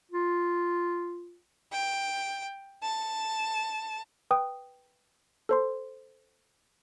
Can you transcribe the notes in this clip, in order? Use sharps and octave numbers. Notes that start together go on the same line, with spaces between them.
F4
G5
A5
B4 G5 D#6
A4 C5 C6